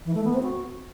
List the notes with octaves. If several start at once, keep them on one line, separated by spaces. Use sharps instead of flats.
E3
A3
B3
C4
F#4